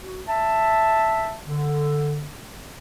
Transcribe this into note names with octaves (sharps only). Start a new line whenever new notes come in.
F#4
E5 A5
D3